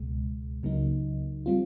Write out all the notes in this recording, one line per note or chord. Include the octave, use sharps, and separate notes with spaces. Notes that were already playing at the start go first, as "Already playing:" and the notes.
Already playing: C#2 B2 G#3
C#2 C#3 F#3 A#3 D#4
G3 C4 F4